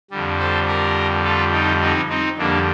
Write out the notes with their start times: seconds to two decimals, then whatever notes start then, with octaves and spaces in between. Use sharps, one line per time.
0.11 F2 D3 G3
0.39 A4 C5
0.68 G4 A#4
1.24 F4 A4
1.53 D#4 G4
1.81 C4 D#4
2.09 C4 D#4
2.37 F2 D3 G3 A#3 D4